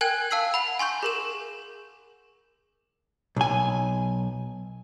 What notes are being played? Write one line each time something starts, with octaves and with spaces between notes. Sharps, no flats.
A#4 G5 G#5 F#6 G#6
F5 A5 E6 C7 F#7
F#5 B5
G#5 C6 C#6 G6
G#4 A#4 E7
B1 G#5